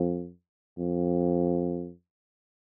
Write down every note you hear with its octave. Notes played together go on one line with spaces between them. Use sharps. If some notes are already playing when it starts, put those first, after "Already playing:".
Already playing: F2
F2